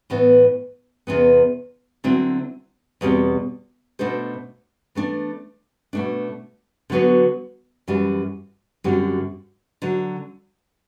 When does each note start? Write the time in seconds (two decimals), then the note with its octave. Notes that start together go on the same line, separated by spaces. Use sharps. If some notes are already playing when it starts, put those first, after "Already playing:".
0.10 A2 E3 B3
1.07 E2 C3 E3 B3
2.04 D3 F#3 C4 E4
3.01 E2 B2 G3 C4
3.99 B2 A3 D4 A4 C5
4.95 E3 A3 D4
5.93 B2 A3 D4
6.90 D3 F#3 B3 F#4
7.88 F#2 E3 G3
8.84 F#2 D3 G3 C4 F#4
9.82 D3 F#3